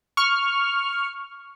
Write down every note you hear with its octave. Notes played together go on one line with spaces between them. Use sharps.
C#6 F6